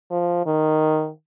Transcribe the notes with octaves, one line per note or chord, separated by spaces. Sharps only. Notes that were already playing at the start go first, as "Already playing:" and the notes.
F3
D#3